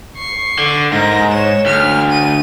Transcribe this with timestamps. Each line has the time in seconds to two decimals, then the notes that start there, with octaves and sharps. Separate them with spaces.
0.16 C#6 C7
0.58 D3
0.92 G#2 A#4 A#6
1.32 C#5 E7
1.66 D2 F6
2.11 D#7